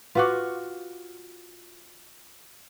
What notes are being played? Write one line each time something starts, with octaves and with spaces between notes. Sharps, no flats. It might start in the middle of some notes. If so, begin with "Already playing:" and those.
F4 F#4 B4 F#5 C#6 D6